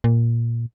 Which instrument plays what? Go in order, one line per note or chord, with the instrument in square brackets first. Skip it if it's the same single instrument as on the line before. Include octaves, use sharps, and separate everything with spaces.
[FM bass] A#2